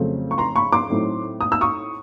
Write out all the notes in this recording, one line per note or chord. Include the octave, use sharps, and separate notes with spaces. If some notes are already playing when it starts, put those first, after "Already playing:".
Already playing: F2 C#3 F#3 A3 C4
C#6
A#5 C6
B5 C#6
C6 D6
A2 F#3 A3 C4 D#4
D#6
E6
C#6 D#6